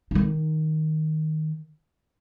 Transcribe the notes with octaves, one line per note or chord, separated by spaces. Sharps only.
D#3 D#4